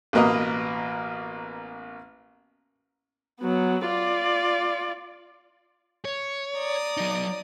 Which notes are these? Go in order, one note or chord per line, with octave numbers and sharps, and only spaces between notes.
A1 B2 A#3 B4 D#5 A#5
F#3 B3
F4 D5
C#5
D5 A#5 D#6
F#3 D#4